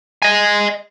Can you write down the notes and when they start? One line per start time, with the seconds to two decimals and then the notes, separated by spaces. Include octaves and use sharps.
0.22 D#5 G#5